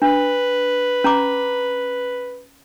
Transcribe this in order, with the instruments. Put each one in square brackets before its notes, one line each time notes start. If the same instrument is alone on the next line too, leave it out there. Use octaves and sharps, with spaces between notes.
[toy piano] D4 [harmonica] B4
[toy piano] C#4 A#5 D6